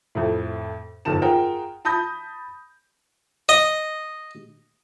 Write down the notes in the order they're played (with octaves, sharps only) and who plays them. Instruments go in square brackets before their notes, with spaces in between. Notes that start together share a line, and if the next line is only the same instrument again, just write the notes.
[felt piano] F2 A2
G1 F2 D#3 A5 E7
F4 G#4 A#4 F#5 G5
A5 B5 D#6 G6 A#6
[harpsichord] D#5